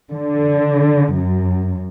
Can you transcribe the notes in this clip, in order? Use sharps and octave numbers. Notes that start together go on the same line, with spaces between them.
D3
F#2